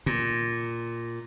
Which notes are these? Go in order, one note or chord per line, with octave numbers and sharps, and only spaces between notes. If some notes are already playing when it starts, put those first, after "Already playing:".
A#2